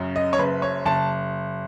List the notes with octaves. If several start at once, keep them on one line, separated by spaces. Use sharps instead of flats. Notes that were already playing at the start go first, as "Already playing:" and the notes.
Already playing: F#2 C#3
D#5
C#5
F#1 B4
C#5
F#1 A5